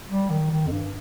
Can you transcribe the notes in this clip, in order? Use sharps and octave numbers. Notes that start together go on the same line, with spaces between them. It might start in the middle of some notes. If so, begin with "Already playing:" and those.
G3
D#3
D#3
F2
G2